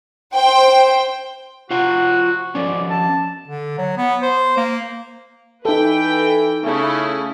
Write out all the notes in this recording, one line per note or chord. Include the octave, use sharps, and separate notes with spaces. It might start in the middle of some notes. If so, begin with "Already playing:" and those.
C5 G5
F4 F#4 C5 F#5
F3 C4 C#4 D5
A5
D3
F#3
B3
C5
A#3
E3 D#4 A4 B4 G5
C#3 A3 E4